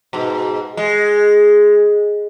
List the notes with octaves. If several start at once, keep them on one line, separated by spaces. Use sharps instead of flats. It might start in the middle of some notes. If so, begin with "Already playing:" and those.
G#2 B2
G#3